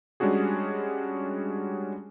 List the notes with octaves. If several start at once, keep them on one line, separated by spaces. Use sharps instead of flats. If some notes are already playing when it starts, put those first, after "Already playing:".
G3 G#3 C#4 D4 F#4 G#4